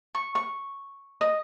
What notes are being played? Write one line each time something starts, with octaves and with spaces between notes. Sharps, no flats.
C#6
C#6
D#5